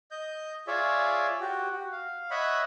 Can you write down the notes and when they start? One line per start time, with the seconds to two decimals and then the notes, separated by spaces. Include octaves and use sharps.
0.11 D#5 G6
0.67 F4 G#4 C#5 D5 E5
1.40 F#4 G4
1.72 F#4
1.92 F5
2.31 C#5 D#5 E5 F#5 B5